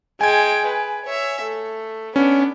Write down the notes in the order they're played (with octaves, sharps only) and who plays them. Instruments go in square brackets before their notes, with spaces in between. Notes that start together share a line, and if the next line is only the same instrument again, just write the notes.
[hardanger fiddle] G#3 G5 [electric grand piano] G#5 G#6
[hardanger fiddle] B4
C#5 E5
A3
[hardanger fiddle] B3 D4 [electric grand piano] C#4